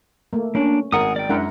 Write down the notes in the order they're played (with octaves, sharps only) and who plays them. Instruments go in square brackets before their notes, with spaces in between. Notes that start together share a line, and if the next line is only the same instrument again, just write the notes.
[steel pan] A3 A#3
[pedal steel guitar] A#3 D4 [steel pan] C#4
[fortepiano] G#1 A#4 [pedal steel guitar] G#4 F#5 D#6
[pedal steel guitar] D5 G5
[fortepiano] F#2 D4 E4 [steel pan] G#3 A#4 F#5